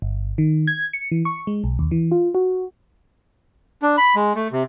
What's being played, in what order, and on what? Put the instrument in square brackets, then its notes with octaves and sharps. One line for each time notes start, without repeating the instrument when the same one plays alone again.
[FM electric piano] G1
D#3
G#6
C#7
E3
C#6
G#3
B1
D#2
E3
F4
F#4
[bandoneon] D4
B5
G#3
A3
C3